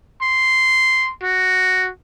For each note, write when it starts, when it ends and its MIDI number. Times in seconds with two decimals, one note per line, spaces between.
0.22 1.12 84
1.23 1.90 66